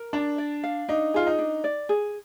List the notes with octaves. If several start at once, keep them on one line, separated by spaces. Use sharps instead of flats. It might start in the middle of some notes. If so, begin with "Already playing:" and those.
Already playing: A#4
D4 D5
D5
F5
D4 D#4
F4 G#4
D#4
D4
D5
G#4